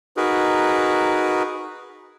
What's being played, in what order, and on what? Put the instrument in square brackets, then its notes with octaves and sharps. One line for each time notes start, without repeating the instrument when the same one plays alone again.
[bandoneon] D#4 F#4 G#4 A#4 B4